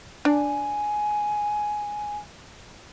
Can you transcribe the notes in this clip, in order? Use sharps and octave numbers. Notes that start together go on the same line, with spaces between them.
D4 D5 G#5